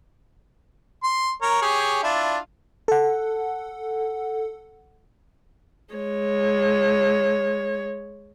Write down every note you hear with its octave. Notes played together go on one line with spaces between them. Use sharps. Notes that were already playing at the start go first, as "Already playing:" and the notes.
C6
A#4 C#5
G4 G#4 C#5
D4 E4 F4
A4 F#5
G#3 C#5